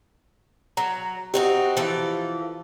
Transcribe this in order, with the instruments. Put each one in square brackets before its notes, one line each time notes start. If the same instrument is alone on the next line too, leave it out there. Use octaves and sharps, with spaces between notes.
[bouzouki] F#3 [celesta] A#5
[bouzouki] C4 D#4 F#4 [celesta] G4
[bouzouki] E3 F3 A4